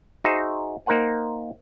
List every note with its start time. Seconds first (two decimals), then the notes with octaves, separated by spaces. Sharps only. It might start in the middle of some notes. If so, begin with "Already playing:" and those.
0.24 D#4 F#4 G#4 C5 E5
0.86 A#3 D#4 A#4 C5 F#5 G#5